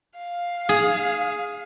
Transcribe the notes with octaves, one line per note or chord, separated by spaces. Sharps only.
F5
G#4